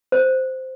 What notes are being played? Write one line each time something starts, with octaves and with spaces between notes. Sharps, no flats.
C5